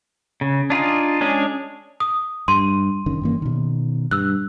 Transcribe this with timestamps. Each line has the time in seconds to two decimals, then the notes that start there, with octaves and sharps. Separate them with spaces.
0.41 C#3
0.70 D4 D#4 F4 G#4
1.21 G#3 C#4 D4 G#4
2.00 D#6
2.48 G2 C6 D#7
3.06 F#1 D#3 C#4
3.22 G2 E3 A#3
3.42 B2 D#3
4.11 G2 E6 F#6